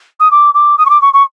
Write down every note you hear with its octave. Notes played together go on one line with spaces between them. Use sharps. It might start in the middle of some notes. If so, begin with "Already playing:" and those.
D#6
D6
D6
D#6
C#6
D6
C#6
C#6